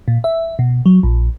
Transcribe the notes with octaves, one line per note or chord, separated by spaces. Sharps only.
A#2
E5
B2
F#3
A#1